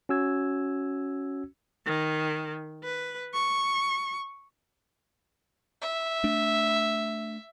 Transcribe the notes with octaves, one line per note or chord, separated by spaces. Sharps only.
C#4 F#4 E6 G#6
D#3
B4
C#6
E5
A3 D4